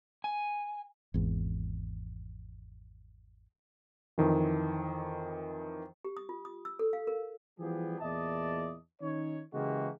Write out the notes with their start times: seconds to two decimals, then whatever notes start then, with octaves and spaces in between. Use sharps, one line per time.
0.24 G#5
1.14 G#1 E2
4.18 F2 D#3 E3
6.04 G4
6.17 D#6
6.29 F4
6.45 D#6
6.65 E6
6.79 A4
6.93 F5
7.07 A#4
7.59 E3 F3 G3 B3 G4 G#4
8.00 E2 A#2 E4 D5 D#5 A5
9.01 D#3 C#4 D#4 C#5
9.54 C#3 E3 G#3 A#3 F#4 G4